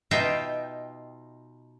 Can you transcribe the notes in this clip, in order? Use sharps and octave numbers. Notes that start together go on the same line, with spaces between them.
B2 D#4 F4 E5 G5